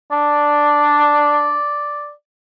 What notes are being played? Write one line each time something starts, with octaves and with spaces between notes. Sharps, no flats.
D4 D5